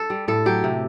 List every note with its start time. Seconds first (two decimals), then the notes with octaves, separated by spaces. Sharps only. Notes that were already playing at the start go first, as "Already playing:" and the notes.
Already playing: A4
0.10 G3
0.28 A2 A4
0.46 F#3 G4
0.64 C3